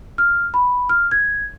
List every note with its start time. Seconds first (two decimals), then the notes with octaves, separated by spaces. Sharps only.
0.18 F6
0.54 B5
0.89 F6
1.11 G#6